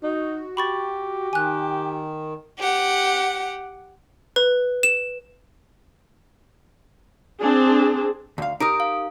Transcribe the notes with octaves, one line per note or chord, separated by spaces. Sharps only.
D#4 F#4
G4 B5 C#6 A6
D#3 G#5 F#6
G4 F#5
B4
E7
C4 D4 G#4
D2 F5
D#4 G4 A#4 D#6 D7
F5